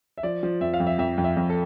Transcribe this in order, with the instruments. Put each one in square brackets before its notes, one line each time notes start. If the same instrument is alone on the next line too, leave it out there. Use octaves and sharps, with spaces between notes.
[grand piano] E5
F3 D5
F3
F2 E5
F5
F2
E5
F2 E5
F2
E5
F2
A4